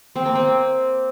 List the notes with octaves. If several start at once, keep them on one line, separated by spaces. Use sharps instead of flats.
C4
A#3
C4